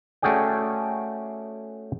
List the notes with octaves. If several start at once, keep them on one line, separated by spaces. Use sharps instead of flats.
A3 C#4 F#4 G#4 D5 G5